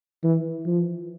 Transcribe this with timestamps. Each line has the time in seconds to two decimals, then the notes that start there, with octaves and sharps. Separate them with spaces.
0.24 E3
0.66 F3